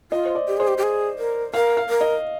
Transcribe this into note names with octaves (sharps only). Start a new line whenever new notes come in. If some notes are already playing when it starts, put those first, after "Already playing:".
F4 D#5
C5
D5
G4
G#4 C5
G4
G4
G#4
A#4
A#4 F5
F5
A#4
D#5